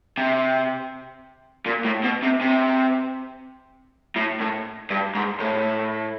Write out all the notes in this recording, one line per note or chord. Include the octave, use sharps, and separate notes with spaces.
C3
A#2
A2
B2
C3
C3
A2
A2
G2
G#2
A2